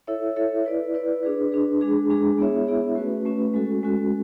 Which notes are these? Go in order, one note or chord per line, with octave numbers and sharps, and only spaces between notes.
E4 A4 C#5 E5
E4 A4 C#5 E5
E4 B4 D5
E4 B4 D5
D4 G#4 B4
D4 G#4 B4
G#3 D4 G#4
G#3 D4 G#4
B3 E4 G#4 C#5 E5
B3 E4 G#4 C#5 E5
A3 C#4 F#4 B4
A3 C#4 F#4 B4
G#3 C#4 F#4 A4
G#3 C#4 F#4 A4